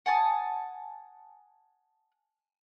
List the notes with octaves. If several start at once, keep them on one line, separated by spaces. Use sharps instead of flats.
F#5 G#5 A5 D#6